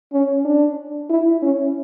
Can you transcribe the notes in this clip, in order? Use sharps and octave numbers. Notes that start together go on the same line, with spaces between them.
C#4
D4
E4
C#4